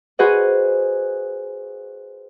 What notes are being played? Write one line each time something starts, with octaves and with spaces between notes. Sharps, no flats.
F#4 G#4 B4 C5 D#5 F#5